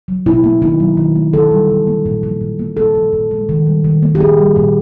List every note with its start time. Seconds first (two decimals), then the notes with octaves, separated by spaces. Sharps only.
0.08 F#3
0.26 B2 E4
0.44 A#3
0.62 D#3 D#4
0.80 F#3
0.97 D#3
1.15 A3
1.33 D3 A4
1.51 G3
1.70 D3
1.87 A#3
2.05 A#2
2.23 F3
2.41 A#2
2.59 A#3
2.77 A#2 A4
2.95 F3
3.13 A#2
3.31 G#3
3.49 D#3
3.66 G3
3.84 D#3
4.02 A#3
4.15 G4
4.20 A#2 G#4
4.38 G3
4.56 A#2